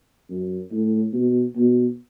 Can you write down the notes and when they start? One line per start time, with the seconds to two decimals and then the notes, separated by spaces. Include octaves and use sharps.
0.30 F#2
0.72 A2
1.13 B2
1.56 B2